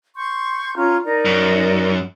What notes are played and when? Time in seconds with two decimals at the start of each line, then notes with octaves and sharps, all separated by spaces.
0.16 C6 C#6 G6
0.75 C#4 F4 A#5
1.05 D#4 A#4 D5
1.25 F#2